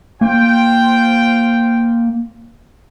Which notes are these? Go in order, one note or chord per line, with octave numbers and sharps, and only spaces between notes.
A#3 F4 C5 G5